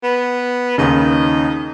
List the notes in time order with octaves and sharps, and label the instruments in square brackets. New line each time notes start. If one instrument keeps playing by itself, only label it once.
[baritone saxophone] B3
[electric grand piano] D#2 C#3 [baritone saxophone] D#4